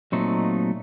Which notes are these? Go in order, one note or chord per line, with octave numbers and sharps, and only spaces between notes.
A#2 F#3 A3 C4 D#4